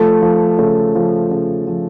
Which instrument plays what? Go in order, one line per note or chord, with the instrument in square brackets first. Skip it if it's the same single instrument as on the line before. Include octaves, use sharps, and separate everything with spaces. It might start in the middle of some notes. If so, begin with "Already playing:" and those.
Already playing: [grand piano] F3 A3
F3
C#3 A3
F3
C#3
F3